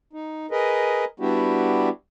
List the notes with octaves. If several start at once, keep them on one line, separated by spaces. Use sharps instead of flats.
D#4
G#4 A#4 B4 D#5
G3 B3 D4 E4 F#4 G4